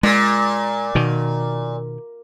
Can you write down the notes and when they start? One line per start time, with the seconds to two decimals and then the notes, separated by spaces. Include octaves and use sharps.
0.03 A#2 G#3
0.95 B2 D#3